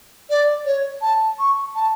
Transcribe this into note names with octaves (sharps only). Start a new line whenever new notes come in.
D5
C#5
A5
C#6
A5